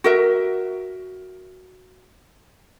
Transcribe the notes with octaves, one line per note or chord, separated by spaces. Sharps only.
F#4 A#4 E5